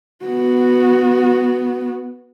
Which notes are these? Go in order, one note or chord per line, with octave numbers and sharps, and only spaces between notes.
B3 F#4